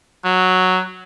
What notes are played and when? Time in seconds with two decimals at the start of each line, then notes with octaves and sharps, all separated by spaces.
0.25 F#3